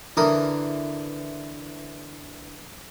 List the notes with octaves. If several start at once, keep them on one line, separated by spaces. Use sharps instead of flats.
D3 E3 A#4 D#6